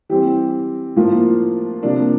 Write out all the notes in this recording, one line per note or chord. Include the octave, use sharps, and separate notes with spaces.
E3 G3 C4 G4
A2 F3 A#3 F4
C3 F3 A#3 D4